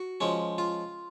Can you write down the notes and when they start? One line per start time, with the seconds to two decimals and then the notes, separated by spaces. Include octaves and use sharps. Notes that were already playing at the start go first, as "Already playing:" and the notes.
Already playing: F#4
0.21 F3 G#3 C#4
0.58 F4